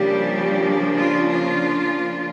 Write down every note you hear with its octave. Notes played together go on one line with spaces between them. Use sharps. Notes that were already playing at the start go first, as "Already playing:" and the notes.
Already playing: C#3 F3 G3 A#3 D4 G4
F4
F4